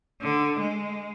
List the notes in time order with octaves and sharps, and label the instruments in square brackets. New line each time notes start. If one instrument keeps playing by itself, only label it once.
[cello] D3
G#3